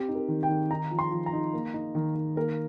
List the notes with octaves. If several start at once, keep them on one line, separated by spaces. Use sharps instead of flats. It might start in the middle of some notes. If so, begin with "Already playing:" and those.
Already playing: C4 G4
D#4
A#4
D#3
G5
D#3
D#4 A#5
F3
C6
F3
A#5
D#4
A#3
D#4
D#3
D#3
A#3 A#4